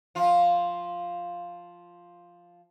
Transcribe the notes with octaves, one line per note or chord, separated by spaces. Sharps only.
F3 F4